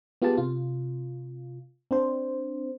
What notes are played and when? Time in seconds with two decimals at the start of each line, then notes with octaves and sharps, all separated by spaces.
0.22 B3 F4 G4 G#4 A5
0.37 C3 F4
1.91 C4 D4 C5